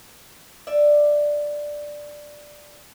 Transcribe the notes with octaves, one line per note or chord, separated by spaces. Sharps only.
D5 E5